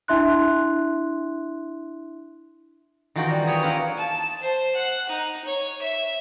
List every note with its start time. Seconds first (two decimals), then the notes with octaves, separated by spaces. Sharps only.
0.08 D4 E4 E5 C6 F#6
3.15 D#3 E3 F4 F#4 A#4 G5
3.30 G3
3.47 G#4 B4 C#5 G5
3.63 A#3 E4 F4 A#4 B4
3.98 A5
4.41 C5
4.75 F#5
5.09 D#4
5.44 C#5
5.81 E5